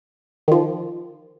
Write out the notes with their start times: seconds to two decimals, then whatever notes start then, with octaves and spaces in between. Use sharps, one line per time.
0.48 D#3 F3